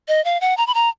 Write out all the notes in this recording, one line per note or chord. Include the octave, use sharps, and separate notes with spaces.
D#5
F5
F#5
A#5
B5
A#5